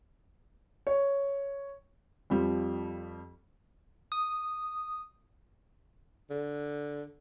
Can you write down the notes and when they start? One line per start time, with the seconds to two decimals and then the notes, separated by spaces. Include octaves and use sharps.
0.87 C#5
2.30 F2 F3 G3
4.12 D#6
6.30 D3